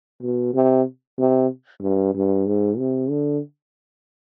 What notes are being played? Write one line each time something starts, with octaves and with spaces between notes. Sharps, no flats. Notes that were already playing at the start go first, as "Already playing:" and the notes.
B2
C3
C3
G2
G2
G#2
C3
D3